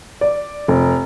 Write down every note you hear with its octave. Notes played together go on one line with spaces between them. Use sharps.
D5
F1